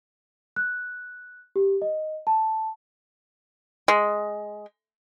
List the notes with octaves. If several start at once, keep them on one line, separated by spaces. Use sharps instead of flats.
F#6
G4
D#5
A5
G#3